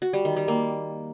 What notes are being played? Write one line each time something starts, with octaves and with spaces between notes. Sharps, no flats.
F#4
G3
D#3
G3
A#3